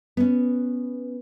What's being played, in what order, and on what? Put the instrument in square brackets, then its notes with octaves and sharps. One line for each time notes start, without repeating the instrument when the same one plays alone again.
[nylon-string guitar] B3 C#4